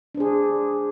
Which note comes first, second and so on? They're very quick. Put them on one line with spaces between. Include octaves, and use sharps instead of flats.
D4 C5 G#4